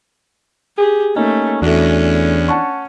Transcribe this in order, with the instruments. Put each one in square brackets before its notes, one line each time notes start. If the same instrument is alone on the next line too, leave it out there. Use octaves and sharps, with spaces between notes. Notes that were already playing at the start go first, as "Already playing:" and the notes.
[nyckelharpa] G4 [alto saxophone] G#4
[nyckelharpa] A3 [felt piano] A#3 D#4 [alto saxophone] C#4
[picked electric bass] E2 [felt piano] A3 F#4 [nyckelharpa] C#4 [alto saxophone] D4
[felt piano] F#5 A5 C#6